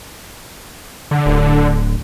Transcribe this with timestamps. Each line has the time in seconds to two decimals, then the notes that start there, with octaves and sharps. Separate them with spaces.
1.11 D3
1.26 D1